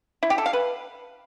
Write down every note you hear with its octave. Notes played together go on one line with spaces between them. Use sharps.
E4
G4
A4
F5
B4